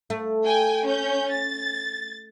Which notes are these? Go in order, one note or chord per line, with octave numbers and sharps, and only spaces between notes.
A3
G5 G#5
C#4 G6
A6